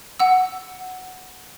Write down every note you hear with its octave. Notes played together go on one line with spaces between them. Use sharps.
F#5 E6